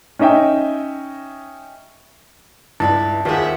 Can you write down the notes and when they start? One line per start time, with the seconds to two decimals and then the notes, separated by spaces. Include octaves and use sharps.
0.19 C#4 D#4 D#5 E5 G5
2.80 C#2 G2 E4 B4 A5
3.25 D#2 F4 G4 G#4 C5 E5 F#5